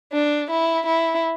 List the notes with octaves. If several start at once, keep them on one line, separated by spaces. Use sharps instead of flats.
D4
E4
E4